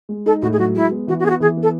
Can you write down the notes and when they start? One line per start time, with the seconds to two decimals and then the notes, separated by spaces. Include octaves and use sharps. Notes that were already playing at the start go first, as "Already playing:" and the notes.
0.09 G#3
0.26 D#4 A4
0.41 A2 F#4
0.52 G#4
0.59 F#3 F#4
0.75 G#3 E4
0.92 B3
1.07 E3 F#4
1.19 F#4
1.24 B3 G#4
1.30 F#4
1.40 E3 G#4
1.57 B3
1.62 A4